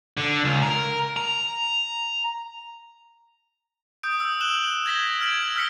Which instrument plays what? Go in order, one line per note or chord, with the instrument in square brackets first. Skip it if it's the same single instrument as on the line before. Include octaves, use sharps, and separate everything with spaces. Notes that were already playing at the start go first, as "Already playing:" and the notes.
[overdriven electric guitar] D3
C#2
A#4
A#5
[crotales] D#6 G6 D7
D#6 E6
D#6 F#6 E7 F#7 G7
G#6 A#6 B6 G7
F6 G#6 D7 F#7
E6 F6 G#6 B6 C#7 G7